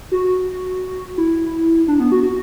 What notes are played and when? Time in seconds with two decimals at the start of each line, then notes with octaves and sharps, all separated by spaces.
0.12 F#4
1.18 E4
1.88 D4
2.00 B3
2.12 F#4
2.22 F#4